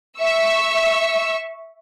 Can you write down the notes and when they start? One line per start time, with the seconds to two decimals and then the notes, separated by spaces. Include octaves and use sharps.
0.19 E5 C#6 E6